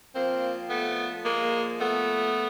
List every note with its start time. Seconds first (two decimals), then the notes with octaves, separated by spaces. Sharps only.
0.15 A#2 F3 A#3 C4
0.70 A3 B3
1.25 G#3 A#3
1.80 A3 B3